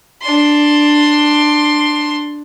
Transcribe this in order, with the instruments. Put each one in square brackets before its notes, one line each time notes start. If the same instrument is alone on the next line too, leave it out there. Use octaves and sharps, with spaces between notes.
[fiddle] D4 C6